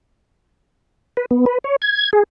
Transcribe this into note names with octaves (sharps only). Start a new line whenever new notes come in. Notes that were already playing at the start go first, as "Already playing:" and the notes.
B4
B3
B4
C#5
G#6
G#4